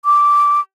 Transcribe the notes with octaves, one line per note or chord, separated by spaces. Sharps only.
D6